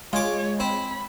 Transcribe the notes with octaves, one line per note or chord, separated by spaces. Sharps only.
G#3 F4 C#5 D6
C4 B5